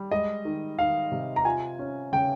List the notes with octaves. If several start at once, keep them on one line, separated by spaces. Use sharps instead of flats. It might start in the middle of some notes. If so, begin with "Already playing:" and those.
Already playing: G3
G#3 D#5
D#3
D#3 F5
C3
A#5
F4 G#5
C#4
C#3 G5